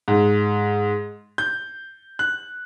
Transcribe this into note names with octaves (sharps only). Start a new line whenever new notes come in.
G#2
G6
F#6